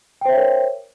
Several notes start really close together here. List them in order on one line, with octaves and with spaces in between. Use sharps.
G5 C5 E5 C#5 A#4